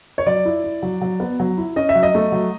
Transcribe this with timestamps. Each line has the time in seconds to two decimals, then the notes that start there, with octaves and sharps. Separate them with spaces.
0.18 C#5
0.26 F#3 D5
0.45 E4
0.64 E4
0.83 F#3
1.02 F#3
1.20 B3
1.40 F#3
1.57 E4
1.76 C#4 D#5
1.89 E5
1.95 F#3
2.03 D#5
2.15 A3
2.32 F#3